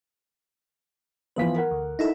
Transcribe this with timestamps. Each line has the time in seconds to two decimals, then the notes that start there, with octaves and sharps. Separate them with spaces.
1.36 E3 F3 B3 B4 B6
1.56 A#4 F#5
1.71 D2
1.99 D#4 E4 A4